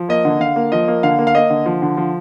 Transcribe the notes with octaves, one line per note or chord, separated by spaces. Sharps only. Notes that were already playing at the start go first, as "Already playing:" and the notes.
Already playing: F3
A#3 D#5
D3
D3 F5
A#3
F3 D#5
A#3
D3 F5
A#3
F5
A#3 D#5
D3
F3
D3
F3